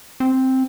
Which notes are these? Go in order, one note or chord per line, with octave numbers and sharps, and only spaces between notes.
C4